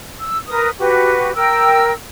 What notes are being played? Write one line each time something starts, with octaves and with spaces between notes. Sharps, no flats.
E6
A#4 B4 D#6
F#4 G4 B4
A#4 G5 E6